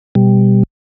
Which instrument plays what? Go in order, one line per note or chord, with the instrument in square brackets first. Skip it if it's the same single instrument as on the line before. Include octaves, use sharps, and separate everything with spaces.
[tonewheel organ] B2 G3